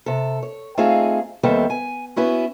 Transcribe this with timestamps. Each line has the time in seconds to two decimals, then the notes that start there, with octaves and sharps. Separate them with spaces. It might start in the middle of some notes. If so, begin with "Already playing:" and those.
0.06 C3 A4
0.43 C#5
0.77 A3 C4 D#4 F4 G#4
1.43 D#2 G3 B3 C4 A4 E5
1.70 G#5
2.16 B3 C#4 E4 F#4